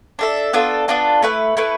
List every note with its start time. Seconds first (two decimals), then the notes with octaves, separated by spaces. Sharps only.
0.19 D4 A4 E5
0.53 B3 D4 F4 A4
0.88 B3 D4 F4 A4
1.22 A3 E4 B4
1.57 A3 E4 B4